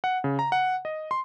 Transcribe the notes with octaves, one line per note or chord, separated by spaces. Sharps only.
F#5
C#3
A#5
F#5
D#5
C6